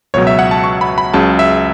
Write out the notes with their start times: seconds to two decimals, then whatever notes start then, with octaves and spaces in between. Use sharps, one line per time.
0.14 C#2 B2 F#3 C#5
0.27 E5
0.39 F#5
0.51 A5
0.64 C#6
0.81 B5
0.98 B5
1.13 C#2 C#3 F#3 A5
1.39 E5